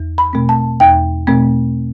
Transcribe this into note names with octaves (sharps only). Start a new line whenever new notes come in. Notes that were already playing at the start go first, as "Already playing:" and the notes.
Already playing: E2
B5
B2 A3 C4
A5
E2 G5
B2 A3 C4